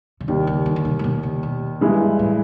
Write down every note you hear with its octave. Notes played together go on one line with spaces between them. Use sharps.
C#3
D#2 C3 D#3 G3
C#3
D3
D3
C3
A#2
B2
C#3
B2
G2 E3 G#3
A2